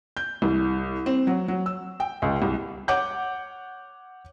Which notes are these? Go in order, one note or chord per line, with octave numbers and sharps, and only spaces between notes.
G6
C2
C4
F#3
F#3
E6
G5
C#2
C2
C#5 F#5 D6 G6